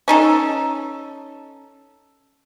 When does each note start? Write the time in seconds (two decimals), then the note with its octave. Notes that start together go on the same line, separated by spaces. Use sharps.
0.08 C#4 D#4 A4